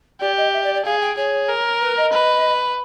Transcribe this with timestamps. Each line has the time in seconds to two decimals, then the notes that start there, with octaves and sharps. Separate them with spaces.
0.20 G4 D5
0.37 D#5
0.53 E5
0.63 D5
0.74 D5
0.85 G#4 F5
1.01 G5
1.17 G#4 C#5
1.48 A#4
1.81 B4
1.97 D#5
2.13 B4